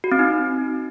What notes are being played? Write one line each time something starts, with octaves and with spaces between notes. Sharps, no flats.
F#4
C4
D#4